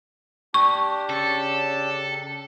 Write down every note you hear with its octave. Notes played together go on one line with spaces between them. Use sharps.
D4 G4 C#6
C#3 A4